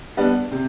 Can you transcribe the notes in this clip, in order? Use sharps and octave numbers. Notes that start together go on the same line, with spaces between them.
G3 B3 D4
C3